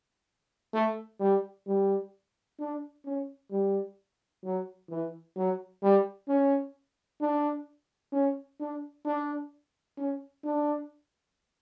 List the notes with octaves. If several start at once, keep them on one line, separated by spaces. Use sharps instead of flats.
A3
G3
G3
D4
C#4
G3
F#3
E3
F#3
G3
C#4
D4
C#4
D4
D4
C#4
D4